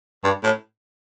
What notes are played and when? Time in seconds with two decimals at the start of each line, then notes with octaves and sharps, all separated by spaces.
0.24 G2
0.43 A2